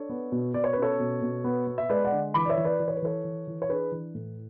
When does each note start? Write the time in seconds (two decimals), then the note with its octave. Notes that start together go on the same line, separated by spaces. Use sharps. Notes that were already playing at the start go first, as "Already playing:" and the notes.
Already playing: D4 A4 C#5
0.09 B3
0.32 B2
0.54 B2 D5
0.64 C#5
0.73 C#4 B4
0.82 A4 C#5
1.00 B2
1.22 B2
1.44 B3
1.67 B3
1.78 E5
1.89 G#3 B4 D5
2.04 D5 F#5
2.12 D3
2.34 E3 B5 D6
2.45 D5
2.49 C#5 E5
2.57 E3
2.64 B4 D5
2.79 E3 D5
2.88 C#5
2.96 B4
3.02 E3 A4 C#5
3.25 E3
3.47 E3
3.62 C#5
3.69 D4 G#4 B4
3.92 E3
4.15 A2